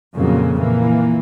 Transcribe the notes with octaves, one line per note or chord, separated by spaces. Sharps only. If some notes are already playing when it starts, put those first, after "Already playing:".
F2 A#2 C#3 F#3 A#3
A#2 E3 A#3